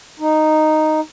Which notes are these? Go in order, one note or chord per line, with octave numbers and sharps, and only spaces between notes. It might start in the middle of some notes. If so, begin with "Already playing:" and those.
D#4